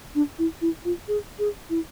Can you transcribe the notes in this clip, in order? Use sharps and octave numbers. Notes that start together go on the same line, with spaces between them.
D4
E4
E4
F4
G#4
G#4
E4